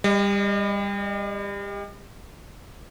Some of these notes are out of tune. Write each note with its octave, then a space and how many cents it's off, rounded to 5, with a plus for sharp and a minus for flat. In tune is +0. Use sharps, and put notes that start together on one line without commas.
G3 +30 D#5 +0